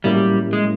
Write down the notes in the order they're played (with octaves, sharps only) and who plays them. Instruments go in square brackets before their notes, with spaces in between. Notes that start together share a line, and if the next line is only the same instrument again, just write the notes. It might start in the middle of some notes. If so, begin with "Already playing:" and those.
[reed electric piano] A2 F#3 A#3 C#4 E4 [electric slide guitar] G3
[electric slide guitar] G#3